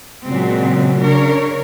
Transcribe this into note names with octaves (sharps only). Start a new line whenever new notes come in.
A#2 C#3 F#3 G#3 C4
C#3 D4 A#4 C#5